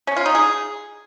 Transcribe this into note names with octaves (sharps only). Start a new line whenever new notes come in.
C#4
F4
D#4
G#4